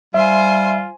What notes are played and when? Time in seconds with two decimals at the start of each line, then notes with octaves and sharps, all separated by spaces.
0.14 G3 F4 C5 E5 G#5